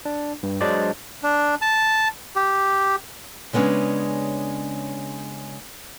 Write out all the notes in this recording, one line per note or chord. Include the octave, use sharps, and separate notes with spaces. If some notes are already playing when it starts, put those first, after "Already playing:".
D4
G2
F#3 G#3 D4 C5 D5 D#5
D4
A5
G4
C#3 G#3 B3 C#4 D4